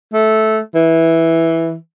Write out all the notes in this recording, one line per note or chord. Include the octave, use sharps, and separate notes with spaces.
A3
E3